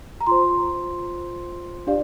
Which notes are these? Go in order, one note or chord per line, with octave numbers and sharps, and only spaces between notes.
A#5
F4 C5 C6
D4 G4 D5 F5